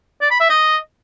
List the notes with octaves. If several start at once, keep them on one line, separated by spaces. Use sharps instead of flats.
D5
B5
E5
D#5